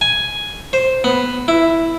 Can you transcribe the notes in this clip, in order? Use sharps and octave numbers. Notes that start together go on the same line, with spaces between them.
G#5
C5
B3
E4